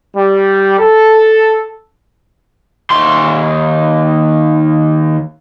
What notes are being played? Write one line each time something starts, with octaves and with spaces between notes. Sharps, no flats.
G3
A4
D#2 C6